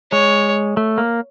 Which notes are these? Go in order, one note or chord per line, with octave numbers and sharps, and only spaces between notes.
G#3 C#5
A3
A#3